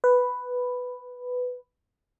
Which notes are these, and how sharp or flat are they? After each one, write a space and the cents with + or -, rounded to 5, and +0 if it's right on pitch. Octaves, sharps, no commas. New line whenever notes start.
B4 +5